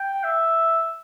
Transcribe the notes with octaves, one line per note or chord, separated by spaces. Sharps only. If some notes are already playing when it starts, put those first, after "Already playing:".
Already playing: G5
E5